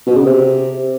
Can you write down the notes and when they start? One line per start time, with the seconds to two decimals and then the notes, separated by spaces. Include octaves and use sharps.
0.07 B2
0.16 C#3
0.25 C3